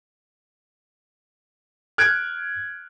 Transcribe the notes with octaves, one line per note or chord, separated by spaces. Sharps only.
F6 F#6 G#6 D7